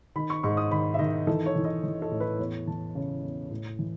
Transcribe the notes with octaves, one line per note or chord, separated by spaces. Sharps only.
D#3 B5
C#6
G#2 C#6
D#6
D#3 B5
E5
D#3 D#5
E3 A4
C#5
E3
D#5
E3
A4
A2
B4
E2 C#5
E3 A5
C#3
E2
A2
E3